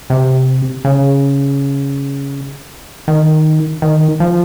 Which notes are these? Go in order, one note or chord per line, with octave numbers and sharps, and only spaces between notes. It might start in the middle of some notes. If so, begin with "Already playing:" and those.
C3
C#3
D#3
D#3
F3